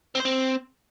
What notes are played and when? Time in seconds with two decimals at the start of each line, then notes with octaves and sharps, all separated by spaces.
0.15 C4
0.20 C5
0.25 C4